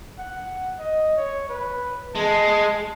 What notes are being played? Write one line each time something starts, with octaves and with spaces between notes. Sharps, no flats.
F#5
D#5
C#5
B4
G#3 A5